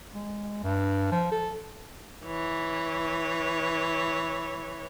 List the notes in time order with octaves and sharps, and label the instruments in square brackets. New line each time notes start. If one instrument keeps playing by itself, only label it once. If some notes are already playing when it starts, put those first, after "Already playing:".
[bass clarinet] G#3
G2
F3
A4
[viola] E3 C#5